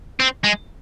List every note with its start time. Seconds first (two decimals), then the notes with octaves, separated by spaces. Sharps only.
0.20 C4
0.44 G#3